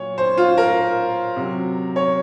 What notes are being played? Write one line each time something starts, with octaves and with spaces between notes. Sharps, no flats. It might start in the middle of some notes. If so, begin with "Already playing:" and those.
Already playing: A#2 F#3 C#5
C5
F4
A#4
C3 F#3
C#5